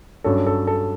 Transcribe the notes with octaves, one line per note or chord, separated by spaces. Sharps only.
G2 F#3 C#4 A4
A4
A4